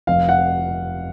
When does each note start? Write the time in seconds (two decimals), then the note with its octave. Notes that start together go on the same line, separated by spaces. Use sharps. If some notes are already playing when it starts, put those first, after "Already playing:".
0.07 F1 F5
0.29 F#5